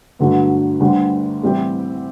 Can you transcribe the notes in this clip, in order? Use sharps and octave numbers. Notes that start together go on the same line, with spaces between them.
G2 D3 F#3 A3
D2 D3 G3
A2 E3 G3 C4 G4